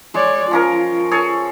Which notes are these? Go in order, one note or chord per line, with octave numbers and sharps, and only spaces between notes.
G#3 C#5 D5
F3 C#4 F4 A#4
G#4 A4 C#5